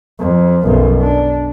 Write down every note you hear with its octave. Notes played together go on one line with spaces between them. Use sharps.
F2
B1 F#2
D4